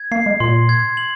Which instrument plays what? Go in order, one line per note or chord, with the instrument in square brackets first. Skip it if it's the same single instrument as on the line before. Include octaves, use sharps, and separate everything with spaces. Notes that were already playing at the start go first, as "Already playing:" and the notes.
Already playing: [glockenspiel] G#6
[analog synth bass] A#3 [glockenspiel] C7
[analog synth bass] G#3
[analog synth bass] A#2 [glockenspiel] C6
[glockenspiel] G#6
F#7